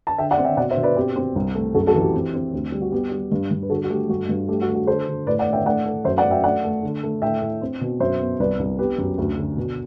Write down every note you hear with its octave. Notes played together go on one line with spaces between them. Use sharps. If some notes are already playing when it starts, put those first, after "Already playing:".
A5
D3 E5 G5
D5 F#5
C4
E5 G5
B2 D5 F#5
C5 E5
B2
B4 D5
C4 G4
C4
C2
A3
F#2 F#4 A4
F#4 A4
E3
G4
C4
C4
D2
G3
F#4
B3 G4
G3
G2
G2
B4
D3 F#4 A4
F#4
A3 G4
G2 F#4
G2
A3 G4
F#4
A3
F#4
D3 A4 C5
D3
A2 B4 D5
D5 F#5
A2
E5 G5
A3 D5 F#5
A3
F#2 C5 E5
D5 F#5
F#2
E5 G5
A3 D5 F#5
A3
D3
A3
A2 E5 G5
A2
C4
B2
F#2 C5 E5
B3
C2 B4 D5
C2
B3 G4 B4
F#2
D2
D3
B2